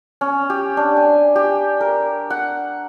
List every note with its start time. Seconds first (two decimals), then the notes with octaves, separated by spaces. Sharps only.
0.21 C#4
0.50 G4
0.77 D4
0.96 G#5
1.36 G4
1.81 A#4
2.30 F#5